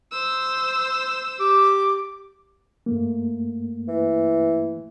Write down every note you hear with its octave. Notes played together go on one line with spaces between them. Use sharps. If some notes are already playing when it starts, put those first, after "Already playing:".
C5 E6
G4 D6
G2 A3 A#3
E3